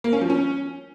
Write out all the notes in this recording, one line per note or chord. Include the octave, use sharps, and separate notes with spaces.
A#3
C#4
F3
C#4